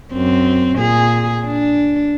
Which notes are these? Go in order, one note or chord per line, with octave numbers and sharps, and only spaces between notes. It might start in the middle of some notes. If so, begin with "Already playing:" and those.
F#2 C4
A#2 G#4
D4